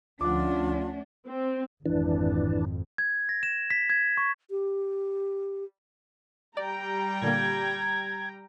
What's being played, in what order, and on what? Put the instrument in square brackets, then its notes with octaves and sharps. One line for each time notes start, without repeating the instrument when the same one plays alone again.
[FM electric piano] D2 F3 [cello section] A3 C#4 D4 [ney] F4 [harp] F#5 D6
[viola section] C4
[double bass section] G#1 F2 [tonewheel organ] E3 D4
[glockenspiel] G#6
A#6
E7
B6
G#6
C#6
[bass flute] G4
[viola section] G3 G5 A#5 [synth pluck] D5
[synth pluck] A#2 D3 A#3 [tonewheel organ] G#6